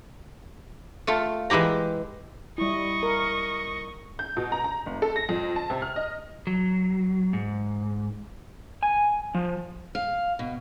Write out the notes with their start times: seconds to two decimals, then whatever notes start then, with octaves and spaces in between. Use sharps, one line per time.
1.07 A3 F4 A4
1.50 E3 G#3 E4 G4 A#5
2.58 G3 E4 D#5 C#6
3.03 A#4
4.19 G6
4.37 B2
4.52 A#5
4.64 A#5
4.86 F1
5.02 A4
5.16 A#6
5.29 F2
5.56 A5
5.70 C3
5.82 F6
5.96 D#5
6.47 F#3
7.33 G#2
8.83 G#5
9.34 F3
9.95 F5
10.39 B2